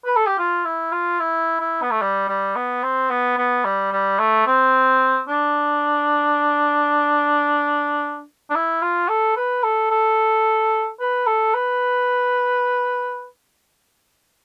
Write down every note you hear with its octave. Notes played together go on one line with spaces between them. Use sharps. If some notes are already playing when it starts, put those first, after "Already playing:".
B4
A4
G4
F4
E4
F4
E4
E4
B3
A3
G3
G3
B3
C4
B3
B3
G3
G3
A3
C4
D4
D4
E4
F4
A4
B4
A4
A4
B4
A4
B4